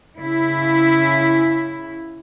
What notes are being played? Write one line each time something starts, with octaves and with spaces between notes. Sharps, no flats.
C#3 E4